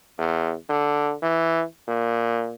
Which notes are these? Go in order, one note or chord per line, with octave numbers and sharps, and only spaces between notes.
E2
D3
E3
A#2